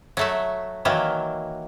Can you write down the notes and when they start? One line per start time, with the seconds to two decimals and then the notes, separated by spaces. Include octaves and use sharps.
0.17 F#3 A3 E5
0.85 D#3 E3 F#3 A#3 E4